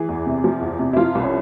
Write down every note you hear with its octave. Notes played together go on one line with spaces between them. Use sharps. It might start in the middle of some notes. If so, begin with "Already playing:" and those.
Already playing: E3 G#4
E2
C3
F3
E2
C3
E4
F3 F4
C2
C#4